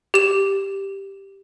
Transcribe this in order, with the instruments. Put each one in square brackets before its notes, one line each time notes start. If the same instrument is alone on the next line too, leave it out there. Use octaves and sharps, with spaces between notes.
[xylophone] G4 E7